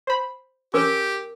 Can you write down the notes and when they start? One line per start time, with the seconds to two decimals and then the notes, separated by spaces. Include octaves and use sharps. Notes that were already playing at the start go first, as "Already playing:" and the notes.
0.07 C5 B5
0.74 C#4 G4 A#4 D6